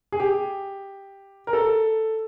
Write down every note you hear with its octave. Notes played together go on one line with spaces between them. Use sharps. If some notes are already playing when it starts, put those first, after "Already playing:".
G#4
G4
A#4
A4